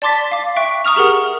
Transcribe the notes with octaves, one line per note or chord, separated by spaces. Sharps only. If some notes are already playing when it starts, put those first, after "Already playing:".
D5 A5 C6 D6 A6 B6
F5 D6
E5 G5 C#6 F#6 D7
A#5 C#6 D#6 F6 F7
G4 G#4 A#4 F#5 F6